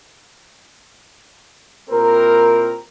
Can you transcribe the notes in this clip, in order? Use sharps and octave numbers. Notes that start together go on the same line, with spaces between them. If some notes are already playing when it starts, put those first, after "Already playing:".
A#2 C4 E4 G4 A#4